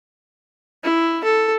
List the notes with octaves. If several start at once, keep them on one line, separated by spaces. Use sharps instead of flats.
E4
A4